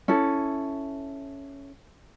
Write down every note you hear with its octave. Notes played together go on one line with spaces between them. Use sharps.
C#4 E4 A4